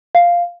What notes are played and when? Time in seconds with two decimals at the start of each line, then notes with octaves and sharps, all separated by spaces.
0.15 F5